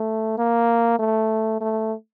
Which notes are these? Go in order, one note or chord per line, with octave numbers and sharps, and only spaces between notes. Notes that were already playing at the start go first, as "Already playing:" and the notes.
Already playing: A3
A#3
A3
A3